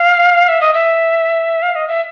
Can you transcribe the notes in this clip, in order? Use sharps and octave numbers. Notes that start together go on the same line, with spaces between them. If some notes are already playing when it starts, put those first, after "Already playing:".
Already playing: F5
E5
D#5
E5
F5
D#5
E5